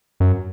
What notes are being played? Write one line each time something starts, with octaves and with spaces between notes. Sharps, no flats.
F#2